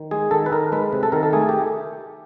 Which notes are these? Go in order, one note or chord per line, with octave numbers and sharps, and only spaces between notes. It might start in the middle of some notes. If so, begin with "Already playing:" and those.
Already playing: D#3
G#3 G#4
D#3 A4
B4
D#3 A#4
G#3 B4
C3
A4
D#3 A#4
A4
A3 G#4
G4